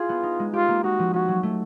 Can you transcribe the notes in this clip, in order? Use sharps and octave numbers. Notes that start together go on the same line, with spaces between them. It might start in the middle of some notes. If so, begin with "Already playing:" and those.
Already playing: E4 F4 G#4
B3
D#4
G#3
F4 G4
A#3
D#4 F#4
F3
C#4 F#4
F#3
A3